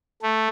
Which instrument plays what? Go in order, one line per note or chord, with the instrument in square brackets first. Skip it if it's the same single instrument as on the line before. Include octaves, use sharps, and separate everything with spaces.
[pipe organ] A3